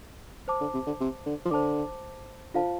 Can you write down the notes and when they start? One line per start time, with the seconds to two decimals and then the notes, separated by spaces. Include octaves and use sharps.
0.48 C5 A5 D6
0.61 D3
0.74 C3
0.87 D3
1.00 C3
1.26 D3
1.45 F3
1.51 D3 C5 A5 D6
2.54 D3 F4 C5 F5 A5